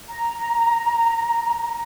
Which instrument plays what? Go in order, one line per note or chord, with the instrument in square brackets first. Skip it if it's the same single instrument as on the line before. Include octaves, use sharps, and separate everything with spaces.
[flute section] A#5